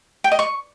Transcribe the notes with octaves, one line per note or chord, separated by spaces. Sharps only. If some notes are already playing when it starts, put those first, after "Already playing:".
G5
D#5
C#6